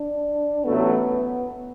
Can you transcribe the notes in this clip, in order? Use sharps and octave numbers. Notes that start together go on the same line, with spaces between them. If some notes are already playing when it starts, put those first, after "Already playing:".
Already playing: D4
A1 A2 F#3 A3 B3